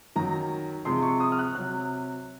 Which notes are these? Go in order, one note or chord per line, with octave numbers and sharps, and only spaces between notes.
F#2 D#3 F#3 A#5
C3 F3 G#3 C6
C#6
D#6
F6
F#6
C3 F#3 F#6